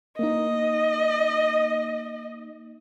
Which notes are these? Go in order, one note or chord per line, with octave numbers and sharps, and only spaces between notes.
A#3 D#4 D#5